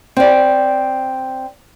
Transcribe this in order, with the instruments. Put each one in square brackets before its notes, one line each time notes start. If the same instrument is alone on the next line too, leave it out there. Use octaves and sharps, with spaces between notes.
[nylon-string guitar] C4 D5